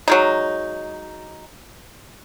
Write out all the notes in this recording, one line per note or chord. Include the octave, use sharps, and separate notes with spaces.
F#3 G#3 D#4